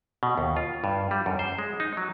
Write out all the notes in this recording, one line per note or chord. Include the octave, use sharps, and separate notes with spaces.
B2
D#2
F4
G2
G3
F#2
C5
G#3
D#4
F#3